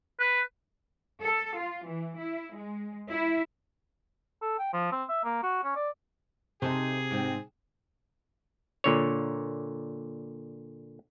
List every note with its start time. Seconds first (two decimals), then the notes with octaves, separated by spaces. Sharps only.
0.20 B4
1.22 A4
1.59 F4
1.88 E3
2.19 E4
2.55 G#3
3.10 E4
4.42 A4
4.59 G5
4.73 F3
4.92 C4
5.09 E5
5.24 A#3
5.43 F#4
5.64 C#4
5.76 D5
6.62 C3 D#4 G#4 A4 C5
7.11 G#2 C4
8.84 A#2 D3 C#5